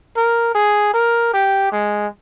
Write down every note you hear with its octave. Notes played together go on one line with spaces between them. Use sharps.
A#4
G#4
A#4
G4
G#3